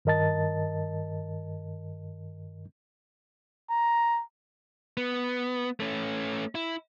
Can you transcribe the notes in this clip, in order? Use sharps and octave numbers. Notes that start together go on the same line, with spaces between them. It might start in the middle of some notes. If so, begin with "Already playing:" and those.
G2 D#3 A#4 D#5 A5 A6
A#5
B3
A3 C#4
E4